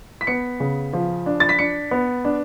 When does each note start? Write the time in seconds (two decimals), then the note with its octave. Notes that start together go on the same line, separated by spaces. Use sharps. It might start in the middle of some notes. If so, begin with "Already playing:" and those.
0.21 B6
0.27 B3 C#7
0.60 C#3
0.93 F3
1.26 D4
1.40 A6
1.49 B6
1.59 D4 C#7
1.91 B3
2.25 D4